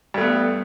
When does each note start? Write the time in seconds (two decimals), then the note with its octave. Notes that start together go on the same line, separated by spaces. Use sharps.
0.14 G2
0.18 A3
0.21 B3